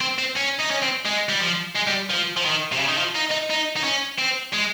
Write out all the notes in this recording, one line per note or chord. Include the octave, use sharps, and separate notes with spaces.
C4
C4
C#4
D#4
C#4
C4
G#3
G3
F3
G#3
G3
F3
F3
D#3
C3
C#3
D#3
F3
D#4
D#4
D#4
D#4
C#4
C4
G#3